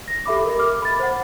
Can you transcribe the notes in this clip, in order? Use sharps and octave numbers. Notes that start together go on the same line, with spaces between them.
A#6
G4 A4 E5 B5 D6
A#4 D#5
D6 F6
B5 A6
C5 F#5